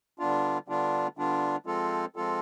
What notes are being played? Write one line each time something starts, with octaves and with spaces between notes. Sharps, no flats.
D3 G3 B3 D4 F4
D3 G3 B3 D4 F4
D3 G3 B3 D4 F4
F3 G#3 C4 F4 A4
F3 G#3 C4 F4 A4